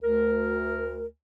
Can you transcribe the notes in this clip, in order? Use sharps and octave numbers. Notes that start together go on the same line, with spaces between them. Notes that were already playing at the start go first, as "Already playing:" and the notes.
D2 A#4